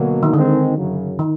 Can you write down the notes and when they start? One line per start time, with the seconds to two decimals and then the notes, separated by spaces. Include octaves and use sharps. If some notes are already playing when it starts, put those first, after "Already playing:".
Already playing: B2 D3 F#3 A#3
0.23 D#3
0.34 D3 D#3 G#3 C4
0.76 F#2 C#3 F#3
1.19 D#3